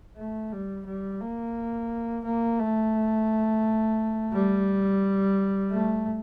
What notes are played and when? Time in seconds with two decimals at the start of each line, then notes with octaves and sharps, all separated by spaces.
0.17 A3
0.52 G3
0.86 G3
1.21 A#3
2.25 A#3
2.59 A3
4.33 G3
5.71 A3